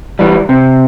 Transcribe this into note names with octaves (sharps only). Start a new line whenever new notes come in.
E3 G3
C3